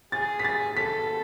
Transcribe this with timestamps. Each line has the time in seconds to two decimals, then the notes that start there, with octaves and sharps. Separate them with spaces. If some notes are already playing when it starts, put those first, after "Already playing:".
0.12 G#4 A6
0.39 B6
0.45 A6
0.77 A4 B6